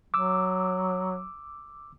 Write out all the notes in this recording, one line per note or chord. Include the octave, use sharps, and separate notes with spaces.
F#3 D6 E6